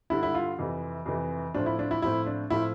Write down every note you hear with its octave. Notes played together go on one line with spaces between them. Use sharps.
G2 D3 G3 E4
E4
F4
F2 C3 E3
F2 C3 E3
A2 F3 C4 D4 F4
E4
D4
E4
A2 F3 C4 E4 F4
D4
A2 F3 C4 E4 F4